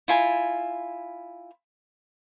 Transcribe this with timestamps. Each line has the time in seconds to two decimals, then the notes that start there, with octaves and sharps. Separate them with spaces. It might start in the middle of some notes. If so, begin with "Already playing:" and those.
0.08 E4 F4 G#5